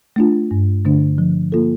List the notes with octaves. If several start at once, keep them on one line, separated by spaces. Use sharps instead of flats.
A3 D4 F4
G2
D3 A3 D4
F3
A#3 F4 A4